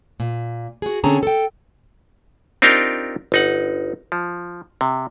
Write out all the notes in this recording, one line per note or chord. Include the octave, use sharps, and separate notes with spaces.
A#2
F#4 G#4
D3 C4 C#4 G#4 A5 A#5
A4 G5
C4 D4 D#4 F4 G4 A#4
G1 D#4 F#5
F3
C3